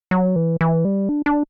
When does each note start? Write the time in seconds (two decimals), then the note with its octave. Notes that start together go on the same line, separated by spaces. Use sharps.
0.11 F#3
0.36 E3
0.61 E3
0.85 G3
1.09 D4
1.26 D4